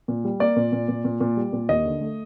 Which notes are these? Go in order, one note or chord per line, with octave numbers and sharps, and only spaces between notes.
A#2
G3
A#3 D5
A#2
A#2
A#2
A#2
A#2
G3
A#2
D#2 D#5
D3
A3